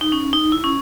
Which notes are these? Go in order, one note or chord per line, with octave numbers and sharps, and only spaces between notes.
D#4
C#4
D#4
E4
C#4